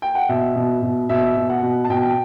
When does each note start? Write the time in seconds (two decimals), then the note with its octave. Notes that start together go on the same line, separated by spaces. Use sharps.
0.02 G5
0.15 F#5
0.29 B2 E5
0.56 B2
0.82 B2
1.09 B2 E5
1.36 B2
1.49 F#5
1.62 B2
1.84 A5
1.90 B2 G5